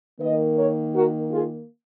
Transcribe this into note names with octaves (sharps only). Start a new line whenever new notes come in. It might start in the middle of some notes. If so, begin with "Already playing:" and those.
D#3 A#3 B4 D#5
A#4 C#5
F#4 A#4
F4 G#4